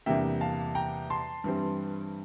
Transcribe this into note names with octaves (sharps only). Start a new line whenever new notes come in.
E2 C3 G3 A#3 D4 E5 G5
F5 A5
G5 A#5
A5 C6
G2 E3 G3 C4